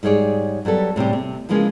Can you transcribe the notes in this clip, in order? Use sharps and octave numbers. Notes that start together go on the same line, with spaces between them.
G#2 G3 G#4 C#5 D5
F#3 G3 B3 A4
A2 C3 G3 G4
C3
C#3 E3 F3 G#3 A#3 C#4